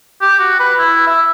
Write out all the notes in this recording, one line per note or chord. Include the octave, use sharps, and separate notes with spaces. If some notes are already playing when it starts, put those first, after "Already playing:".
G4
F#4
B4
E4
E5